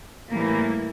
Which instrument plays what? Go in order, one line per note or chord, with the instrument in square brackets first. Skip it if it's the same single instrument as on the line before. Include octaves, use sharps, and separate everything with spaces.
[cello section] A2 E3 G3 A#3